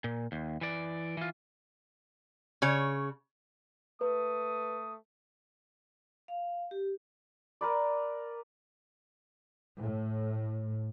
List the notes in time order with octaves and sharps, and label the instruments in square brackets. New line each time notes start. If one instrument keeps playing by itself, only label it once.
[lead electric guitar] A#2
D#2
E3 D5
E3 F4
[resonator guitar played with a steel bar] C#3 C#5
[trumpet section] A3 D#6 [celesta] B4
[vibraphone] F5
G4
[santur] A#4 B4 D5
[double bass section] A2